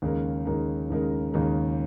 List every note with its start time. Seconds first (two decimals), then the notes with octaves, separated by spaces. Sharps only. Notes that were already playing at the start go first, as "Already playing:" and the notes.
0.02 D#2 C#3 G#3 D#4 A#4
0.45 D#2 C#3 G#3 D#4 A#4
0.90 D#2 C#3 G#3 D#4 A#4
1.32 D#2 C#3 G#3 D#4 A#4